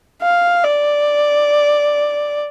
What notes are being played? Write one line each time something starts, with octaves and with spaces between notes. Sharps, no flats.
F5
D5